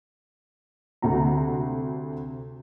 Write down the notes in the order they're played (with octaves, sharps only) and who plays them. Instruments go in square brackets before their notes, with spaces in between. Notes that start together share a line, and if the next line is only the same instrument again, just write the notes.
[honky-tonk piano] D2 C3 F#4 A#5